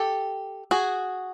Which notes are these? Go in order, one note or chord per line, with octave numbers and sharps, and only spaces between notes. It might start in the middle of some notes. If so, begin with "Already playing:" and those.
Already playing: G4 A4
F#4 G#4